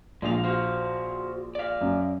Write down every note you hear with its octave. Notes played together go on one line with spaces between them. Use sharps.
A#1 G#3 F4 F5 F7
F#4 C5 F5
D5 F5
F#2